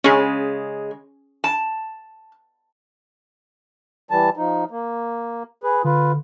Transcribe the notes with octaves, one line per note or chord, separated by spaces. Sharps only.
C#3 G#3 C#4 G#4
A5
E3 G3 A5
F3 D#4
A#3
G#4 B4
D3 F4 B4